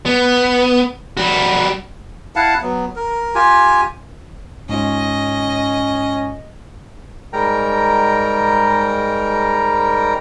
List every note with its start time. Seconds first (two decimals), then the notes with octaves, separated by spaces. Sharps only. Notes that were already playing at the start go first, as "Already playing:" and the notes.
0.06 B3
1.17 G3 F#4
2.36 E4 F5 F#5 A5
2.61 F#3 B3
2.96 A#4
3.35 F4 G4 G#5
4.69 G#2 C#4 F4 D#5
7.33 G#2 G3 G#3 A#4 G5 A#5